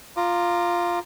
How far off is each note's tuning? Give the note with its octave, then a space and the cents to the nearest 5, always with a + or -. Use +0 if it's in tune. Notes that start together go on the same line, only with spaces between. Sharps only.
F4 +0 A#5 +0 D6 +30